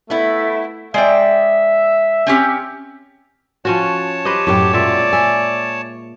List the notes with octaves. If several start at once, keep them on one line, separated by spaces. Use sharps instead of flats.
A3 B3 E4
G#3 D5 E5 G5
C4 C#4 G4
F3 C#4 F#4 C#5 A5
G4 B4 C5 D#5
F#2 A2 G4 A4 G5
A#2 G#3 D5 E5
E5 G#5